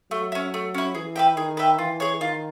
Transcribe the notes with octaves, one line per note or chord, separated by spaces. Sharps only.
F#3 A3
C#4 E4
A3
C#4 E4
E3 G#4
B4 E5 G5
D#3 G#4
B4 E5 G5
E3 F4
G#4 C#5
D#3 F4